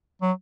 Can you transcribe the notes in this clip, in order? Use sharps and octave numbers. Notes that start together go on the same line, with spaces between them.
F#3